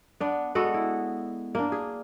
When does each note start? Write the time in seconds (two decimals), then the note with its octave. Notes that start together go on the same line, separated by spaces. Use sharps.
0.20 B3 D4
0.55 G#3 B3 F#4 A4
0.74 E4
1.55 A#3 D4
1.72 G#4